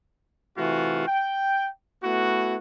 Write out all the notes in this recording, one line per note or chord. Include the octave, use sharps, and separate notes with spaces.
C3 E3 A3 F4 F#4
G5
A3 B3 E4 F#4